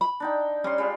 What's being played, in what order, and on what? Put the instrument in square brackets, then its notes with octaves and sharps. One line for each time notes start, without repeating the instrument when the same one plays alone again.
[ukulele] B5
[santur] D4 D#4 G5
[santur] G3 C6 [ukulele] C#4
[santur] G3 G#3 F4